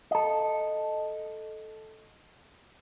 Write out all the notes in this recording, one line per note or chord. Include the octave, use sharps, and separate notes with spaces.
A4 D#5